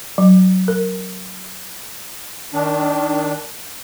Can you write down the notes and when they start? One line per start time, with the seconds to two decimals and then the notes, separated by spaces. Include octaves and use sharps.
0.18 F#3
0.68 A#4
2.54 D#3 D4